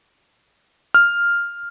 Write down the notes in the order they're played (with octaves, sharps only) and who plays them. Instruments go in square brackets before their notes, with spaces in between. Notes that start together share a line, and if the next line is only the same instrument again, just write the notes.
[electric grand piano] F6